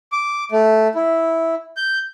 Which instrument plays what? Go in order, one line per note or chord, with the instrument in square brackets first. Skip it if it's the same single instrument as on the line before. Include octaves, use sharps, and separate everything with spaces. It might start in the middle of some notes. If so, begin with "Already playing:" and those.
[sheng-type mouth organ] D6
A3
E4
G6